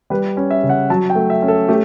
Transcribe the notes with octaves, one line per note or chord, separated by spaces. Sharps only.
G3 B4
C#4
E5
C#3
F#5
F#3 A5
G5
A3
E5
C#4
A4
A3 G4